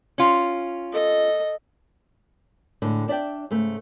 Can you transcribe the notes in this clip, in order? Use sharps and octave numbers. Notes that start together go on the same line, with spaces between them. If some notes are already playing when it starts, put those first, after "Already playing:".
C#4 F4
A4 D#5
A2 D3 G#3
D4 D5 E5 G5
G#2 C#3 A3